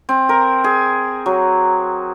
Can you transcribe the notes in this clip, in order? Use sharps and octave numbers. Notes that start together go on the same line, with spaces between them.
C4
A#4
G#4
F#3